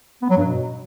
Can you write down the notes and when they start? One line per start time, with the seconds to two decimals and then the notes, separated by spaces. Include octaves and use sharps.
0.22 B3
0.30 F#3
0.37 G2
0.45 B2